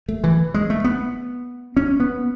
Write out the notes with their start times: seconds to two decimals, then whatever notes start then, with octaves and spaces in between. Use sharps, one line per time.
0.09 A3
0.24 E3
0.54 G#3
0.70 A3
0.84 B3
1.77 C#4
2.00 B3